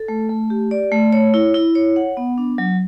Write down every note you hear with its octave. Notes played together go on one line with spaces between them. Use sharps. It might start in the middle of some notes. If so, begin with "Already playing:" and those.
Already playing: A4
A3
A3
G4
D5
A3
C#5
E4
E4
C#5
F#5
B3
D4
F#3